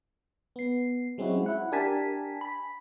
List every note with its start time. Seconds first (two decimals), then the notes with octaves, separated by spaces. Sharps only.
0.56 B3 C7
1.18 F#3 G#3 C4 C#4 E4 F#4
1.46 E4 F#5
1.72 D4 G4 A#4 G#5 A5 B6
2.41 B5